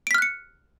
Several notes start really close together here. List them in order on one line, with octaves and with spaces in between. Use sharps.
D7 B6 F6 F#6 C#7